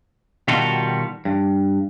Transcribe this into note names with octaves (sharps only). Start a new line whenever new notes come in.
B2 D#3 G3 F4 F#4 A4
G2